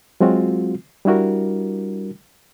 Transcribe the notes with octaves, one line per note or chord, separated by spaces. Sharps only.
F#3 G#3 C4 F4 F#4
G3 D4 E4 F#4 A#4